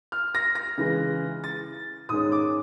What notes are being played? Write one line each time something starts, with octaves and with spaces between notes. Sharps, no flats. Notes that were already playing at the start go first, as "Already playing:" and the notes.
F6
A#6
A#6
C#3 E3 G#3
A6
G#2 D#3 G#3 C#4 D#6
D6